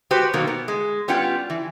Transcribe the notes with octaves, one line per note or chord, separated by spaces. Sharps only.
G#3 F#4 G4 B4 C5
B2 D#3 F#3 A#3
B2
G#3
G3 B3 C#4 F4 G5
E3